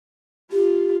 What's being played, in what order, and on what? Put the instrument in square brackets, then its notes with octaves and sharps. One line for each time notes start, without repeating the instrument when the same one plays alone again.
[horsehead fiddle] F4 [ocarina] G4